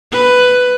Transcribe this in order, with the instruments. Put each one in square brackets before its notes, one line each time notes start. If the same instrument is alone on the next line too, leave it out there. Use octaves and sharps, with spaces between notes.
[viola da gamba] B4